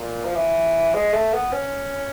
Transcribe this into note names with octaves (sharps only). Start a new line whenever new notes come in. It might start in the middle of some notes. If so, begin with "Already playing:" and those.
Already playing: A#2
F3
E3
G#3
A3
B3
C#4